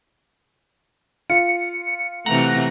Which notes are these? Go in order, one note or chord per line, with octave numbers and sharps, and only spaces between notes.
F4 C#7
C3 E3 A3 F#5 A#5